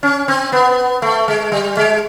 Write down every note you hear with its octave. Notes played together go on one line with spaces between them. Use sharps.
C#4
C4
B3
A3
G#3
G3
G#3